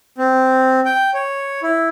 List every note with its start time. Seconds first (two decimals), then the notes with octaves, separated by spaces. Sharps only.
0.18 C4
0.85 G5
1.14 C#5
1.63 E4